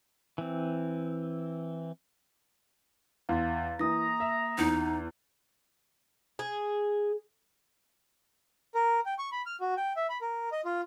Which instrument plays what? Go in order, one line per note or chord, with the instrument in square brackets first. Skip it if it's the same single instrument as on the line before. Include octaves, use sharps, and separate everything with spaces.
[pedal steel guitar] E3 C4
[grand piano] E2 [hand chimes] F5 C6 A6
[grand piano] E3 [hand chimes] A#3 D#6 A#6 [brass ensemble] A#5
[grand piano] E5
[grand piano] E2 [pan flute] D#4
[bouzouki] G#4
[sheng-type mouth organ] A#4
G5
C#6
B5
F6
F#4
G5
E5
B5
A#4
D#5
F4